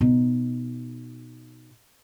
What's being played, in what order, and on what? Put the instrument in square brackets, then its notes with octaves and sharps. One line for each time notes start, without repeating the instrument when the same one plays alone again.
[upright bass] B2 D#4